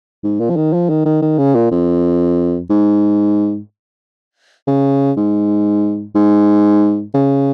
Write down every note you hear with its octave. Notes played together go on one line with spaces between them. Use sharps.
G#2
A#2
F3
D#3
F3
D#3
D#3
D#3
C#3
A#2
F2
G#2
C#3
G#2
G#2
C#3